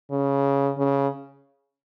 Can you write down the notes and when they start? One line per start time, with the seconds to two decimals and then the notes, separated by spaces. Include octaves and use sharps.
0.11 C#3
0.78 C#3